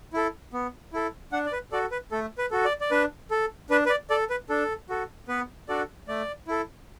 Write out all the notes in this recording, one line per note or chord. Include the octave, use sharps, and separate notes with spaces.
E4 A4
B3
E4 A4
D4 F#5
D5
B4
F#4 A4 D5
B4
A3 A4
B4
F#4 A4
D5
D5
D4 B4
A4
D4 B4
B4
D5
A4 D5
B4
D4 A4
F#4 A4
B3 B4
D4 F#4 A4 D5
A3 D5
E4 A4